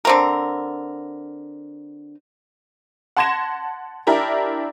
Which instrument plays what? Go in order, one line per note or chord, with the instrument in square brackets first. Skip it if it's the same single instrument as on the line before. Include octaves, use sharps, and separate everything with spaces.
[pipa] D3 C4 A#4
[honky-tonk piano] F#5 A5 C6 G#6 A#6 E7
D4 E4 G4 A#4 A#5